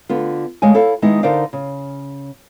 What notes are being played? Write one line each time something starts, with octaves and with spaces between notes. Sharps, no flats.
D3 B3 F4
D2 G#3 C#5 F5 G#5
E4 A4 C#5 F5
D#3 G#3 B3 D#4 E4
D3 D#4 A#4 C5 D5 F5
C#3